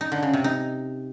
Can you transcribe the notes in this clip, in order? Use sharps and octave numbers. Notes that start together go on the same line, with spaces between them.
D#4
D3
C#3
C3
D#4